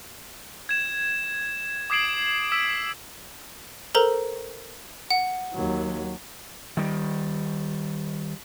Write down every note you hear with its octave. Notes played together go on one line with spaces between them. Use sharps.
G#6 E7
D6 D#6 G#6 C7 D7 F#7
E6 B6 D7
A4 A#4 C5 A#5
F#5
D#2 F#3
D#3 G3